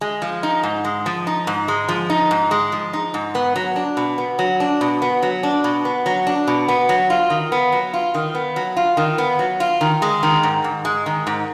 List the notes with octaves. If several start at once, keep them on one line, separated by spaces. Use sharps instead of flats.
G#3
F3
D#4
G#2
G#3
F3
D#4
G#2
G#3
F3
D#4
G#2
G#3
F3
D#4
G#2
B3
F#3
D4
B2
B3
F#3
D4
B2
B3
F#3
D4
B2
B3
F#3
D4
B2
B3
F#3
F4
D#3
B3
F#3
F4
D#3
B3
F#3
F4
D#3
B3
F#3
F4
D#3
G#3
D#3
G#2
G#2
G#3
D#3
G#2